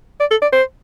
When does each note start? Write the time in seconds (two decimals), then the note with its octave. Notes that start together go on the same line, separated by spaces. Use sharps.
0.20 D5
0.31 A4
0.42 D5
0.53 C5